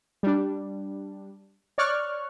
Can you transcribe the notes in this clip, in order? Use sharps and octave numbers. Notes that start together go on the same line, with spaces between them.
G3 D4
C#5 D5 C#6 F6 F#6